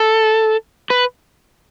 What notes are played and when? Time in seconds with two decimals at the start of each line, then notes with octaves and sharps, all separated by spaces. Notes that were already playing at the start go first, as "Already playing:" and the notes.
Already playing: A4
0.90 B4